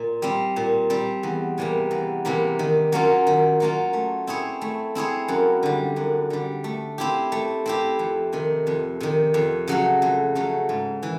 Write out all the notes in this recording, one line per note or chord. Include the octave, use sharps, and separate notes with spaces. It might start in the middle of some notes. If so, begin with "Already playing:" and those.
Already playing: A#2
G3 C4
A#2
G3 C4
E2
C3 E3 G3 A#3
E2
C3 E3 G3 A#3
D#3
F#3 A#3 C#4 F4
D#3
F#3 A#3 C#4 F4
A3
C4 E4 G#4 C#5
A3
C4 E4 G#4 C#5
F#2
D3 G3
F#2
D3 G3
A3
C4 E4 G4
A3
C4 E4 G4
F2
C3 D#3
F2
C3 D#3
F2
C#3 F#3 A3
F2
C#3 F#3 A3
G#2
E3